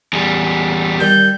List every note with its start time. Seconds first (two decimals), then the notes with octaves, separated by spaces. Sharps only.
0.13 E2 G3
1.00 D#3 G3 G6